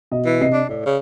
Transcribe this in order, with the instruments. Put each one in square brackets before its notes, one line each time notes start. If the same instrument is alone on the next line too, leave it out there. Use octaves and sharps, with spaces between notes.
[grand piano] B2 D#5
[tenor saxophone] E3
[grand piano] C3 D#5 C7
[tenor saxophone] D4
[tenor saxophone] A2 [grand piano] D5
[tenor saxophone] C#3